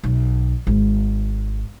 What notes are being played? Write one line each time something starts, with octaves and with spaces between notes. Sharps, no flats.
B1
G#1